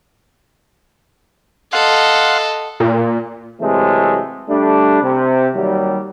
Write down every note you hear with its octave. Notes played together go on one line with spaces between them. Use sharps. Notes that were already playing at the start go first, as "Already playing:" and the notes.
A4 D#5 F5 F#5 C6
A#2
C3 E3 F#3 G#3 A3
G3 A3 D4
C3
D#2 F#3 G3